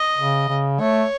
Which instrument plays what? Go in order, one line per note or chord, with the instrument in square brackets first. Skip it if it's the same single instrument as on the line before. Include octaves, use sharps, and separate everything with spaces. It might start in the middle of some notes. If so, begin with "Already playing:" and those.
Already playing: [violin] D#5
[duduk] C#3
C#3
[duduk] A3 [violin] C#5